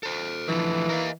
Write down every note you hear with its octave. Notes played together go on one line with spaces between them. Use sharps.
A4 C5
D3 E3 F3 A3
A#4 D#5 F5